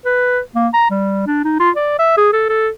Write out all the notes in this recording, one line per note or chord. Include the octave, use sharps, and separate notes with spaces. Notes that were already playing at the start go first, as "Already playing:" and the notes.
B4
A#3
A#5
G3
D4
D#4
F4
D5
E5
G#4
A4
A4